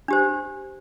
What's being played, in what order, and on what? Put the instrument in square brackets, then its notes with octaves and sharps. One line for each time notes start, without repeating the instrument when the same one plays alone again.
[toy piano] D4 G4 C5